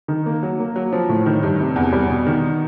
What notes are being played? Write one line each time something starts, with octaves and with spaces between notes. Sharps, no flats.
D#3
A#3
F#3
A#3
F#3
F3
A2
D#3
G2
C3
E2
G3
B2
D#3